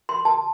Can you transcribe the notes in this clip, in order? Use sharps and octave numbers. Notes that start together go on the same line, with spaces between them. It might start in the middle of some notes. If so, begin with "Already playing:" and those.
C6
A5